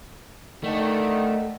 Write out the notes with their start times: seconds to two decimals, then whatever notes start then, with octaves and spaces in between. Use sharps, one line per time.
0.64 D3 D#3 A3